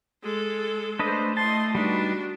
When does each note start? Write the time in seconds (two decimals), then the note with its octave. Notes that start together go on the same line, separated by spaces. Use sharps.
0.23 G#3 A4
0.99 A3 D4 B4 C5 D#5
1.37 A3 E4 D#5 A5 C6
1.75 G3 D4 D#4 F#4 B4